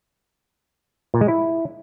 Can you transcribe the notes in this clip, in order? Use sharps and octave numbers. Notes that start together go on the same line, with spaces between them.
A#2
G#3
E4